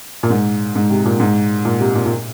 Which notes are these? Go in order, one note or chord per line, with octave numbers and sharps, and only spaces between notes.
A#2
G#2
G#2
C3
A#2
G#2
A#2
C3
A#2
A#2